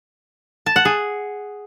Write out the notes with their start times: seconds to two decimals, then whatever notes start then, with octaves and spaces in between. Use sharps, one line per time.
0.66 A5
0.76 F#5
0.85 G#4